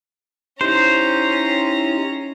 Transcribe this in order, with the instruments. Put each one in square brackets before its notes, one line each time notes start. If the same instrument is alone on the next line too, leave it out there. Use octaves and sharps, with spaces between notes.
[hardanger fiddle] C#4 A#5 [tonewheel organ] D#4 E4 G4 [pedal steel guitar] C5